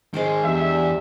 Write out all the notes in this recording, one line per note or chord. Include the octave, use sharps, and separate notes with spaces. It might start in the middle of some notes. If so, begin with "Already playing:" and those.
D#3 G#3 G#4 C5 D6
E2 D4 G4 E5